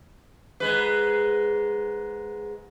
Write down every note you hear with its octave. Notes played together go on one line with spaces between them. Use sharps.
G#2 G#3 B4